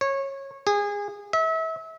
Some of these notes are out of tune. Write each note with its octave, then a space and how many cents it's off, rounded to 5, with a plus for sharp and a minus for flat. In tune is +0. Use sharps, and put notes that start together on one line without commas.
C#5 -20
G#4 -25
E5 -30